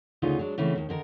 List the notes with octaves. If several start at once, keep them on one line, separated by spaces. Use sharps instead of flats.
D2 C#3 D#4 F4
F#3 G#3 D4
C#3 E3 A3 C4
D#2 D#3
D3 D#3 A#4